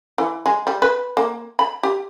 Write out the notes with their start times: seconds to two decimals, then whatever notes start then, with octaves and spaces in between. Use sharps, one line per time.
0.18 E3
0.46 G#3
0.67 G3
0.82 B4
1.17 A#3
1.59 B5
1.83 G4